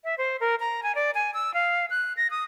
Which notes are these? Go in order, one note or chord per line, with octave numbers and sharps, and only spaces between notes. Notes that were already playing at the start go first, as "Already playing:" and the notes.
E5
C5
A#4
A#5
G#5
D5
G#5
E6
F5
F#6
A#6
D#6